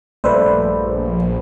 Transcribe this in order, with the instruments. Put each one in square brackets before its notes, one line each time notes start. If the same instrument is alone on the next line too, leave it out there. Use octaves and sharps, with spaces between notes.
[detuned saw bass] A#1 [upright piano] G2 A3 E6 [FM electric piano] B4 C5 [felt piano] D5